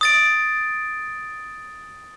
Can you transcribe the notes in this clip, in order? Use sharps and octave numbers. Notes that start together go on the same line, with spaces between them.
D#6 A6 D7